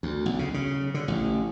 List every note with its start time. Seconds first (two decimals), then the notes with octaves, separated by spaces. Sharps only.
0.03 D2
0.26 B1
0.39 C#3
0.54 C#3
0.94 D3
1.08 A1